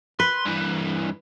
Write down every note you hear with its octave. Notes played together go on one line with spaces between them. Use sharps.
B4 C6
G2 E3